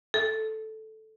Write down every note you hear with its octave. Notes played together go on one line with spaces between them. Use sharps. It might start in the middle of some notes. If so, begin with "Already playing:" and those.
A4